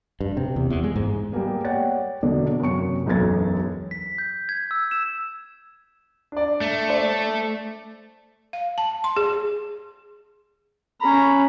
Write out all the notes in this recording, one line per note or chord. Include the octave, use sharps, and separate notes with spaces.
G2
C3
E2
E2
G#3
G#2
G3 G#3 A#3 B3
C#5 D5 F#5 G5 A6
E1 B2 D3 B3 D5
F#2 C3 A#3 C#5 C#6 C#7
E1 B1 F#2 B4 G#6 A6
B6
G6
G#6
E6
E7
D4 D5
A3
C5 D5
F5
A5
C6
G#4
C#4 A#5 B5